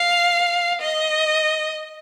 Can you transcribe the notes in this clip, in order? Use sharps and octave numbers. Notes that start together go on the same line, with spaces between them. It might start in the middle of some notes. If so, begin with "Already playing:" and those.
Already playing: F5
D#5